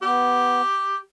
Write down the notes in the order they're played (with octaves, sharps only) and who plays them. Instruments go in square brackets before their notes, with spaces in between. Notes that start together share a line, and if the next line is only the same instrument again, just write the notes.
[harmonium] B3 [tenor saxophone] G4